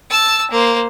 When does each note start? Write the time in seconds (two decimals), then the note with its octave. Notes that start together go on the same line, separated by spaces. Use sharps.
0.11 A5 E6
0.51 A#3 C5